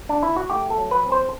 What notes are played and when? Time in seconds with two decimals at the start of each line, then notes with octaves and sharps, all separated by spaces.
0.09 D4
0.23 E4
0.36 F#4
0.50 A3 G4
0.70 A4
0.78 F#3
0.91 B4
1.05 C4
1.12 C5